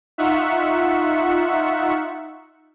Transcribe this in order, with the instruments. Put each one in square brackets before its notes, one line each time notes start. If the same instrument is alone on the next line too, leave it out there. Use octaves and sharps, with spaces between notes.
[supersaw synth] D#4 F4 E5 F#5 C#6